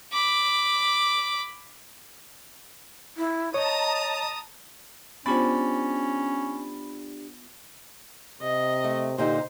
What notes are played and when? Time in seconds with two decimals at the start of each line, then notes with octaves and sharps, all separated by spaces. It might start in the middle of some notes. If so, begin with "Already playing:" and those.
0.12 B5 D6
3.17 E4
3.54 C#5 D#5 A5 A#5 D#6
5.26 B3 C#4 D4 F4 G4 C5 B5 A6
8.42 C3 D#5
8.84 A3
9.18 A#2 D3 D#4 G4 C5